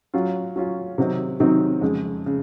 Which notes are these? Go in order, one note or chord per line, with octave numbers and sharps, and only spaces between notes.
F#3 C#4 F4
F#3 C#4 F4
C3 D#3 F#3 C4 D#4
C3 D#3 F#3 C4 D#4
F2 C#3 G#3
C#3